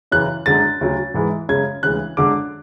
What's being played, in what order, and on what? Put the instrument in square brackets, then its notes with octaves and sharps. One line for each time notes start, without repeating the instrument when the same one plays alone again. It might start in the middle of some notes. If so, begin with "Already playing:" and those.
[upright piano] F#2 C#3 E3 F#6
F#2 D3 G#3 A6
D2 C#3 F#3
G#2 E3 G#3
F#2 C#3 G#3 G#6
D2 C#3 E3 G#3 F#6
F#2 D3 G#3 D6